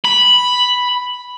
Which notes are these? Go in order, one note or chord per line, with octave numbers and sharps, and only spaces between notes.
B5